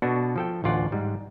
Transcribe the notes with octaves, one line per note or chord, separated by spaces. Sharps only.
B2 B3 D4 F#4 A4
F3 A4 G5
A1 D2 F4 D5 F#5
G#2 G3 G#3